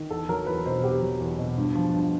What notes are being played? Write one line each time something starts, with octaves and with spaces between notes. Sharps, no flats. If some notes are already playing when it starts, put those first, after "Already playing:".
Already playing: D#3
E2 A4
F#3 A#4
E2 B4
B2 C5
E2 G4
F#3
E2
B2
G2
F3
G2